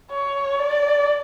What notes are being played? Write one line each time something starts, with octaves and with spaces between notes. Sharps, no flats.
C#5
D5